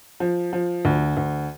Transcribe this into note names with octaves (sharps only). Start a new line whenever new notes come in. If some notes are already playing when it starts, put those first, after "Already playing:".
F3
F3
D2
D2